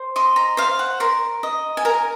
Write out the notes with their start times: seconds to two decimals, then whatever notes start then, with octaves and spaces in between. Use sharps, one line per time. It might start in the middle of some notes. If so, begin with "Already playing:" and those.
Already playing: C5
0.16 D#5 C6
0.36 A#5
0.57 C5 F5
0.79 F#5
1.00 A#4 C6
1.43 D#5
1.77 G#5
1.85 A#4 A#5